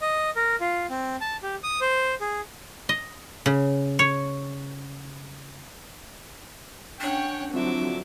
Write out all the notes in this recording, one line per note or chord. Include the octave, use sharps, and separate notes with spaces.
D#5
A#4
F4
C4
A5
G4
D#6
C5
G#4
D#5
C#3
C#5
C#4 D4 C#5 F#5 G5
D3 F3 F#3 C4 E4 F4 E5 D6